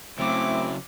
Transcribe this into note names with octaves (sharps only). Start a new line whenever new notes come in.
C#3 F#3 A3 C4 E4 D6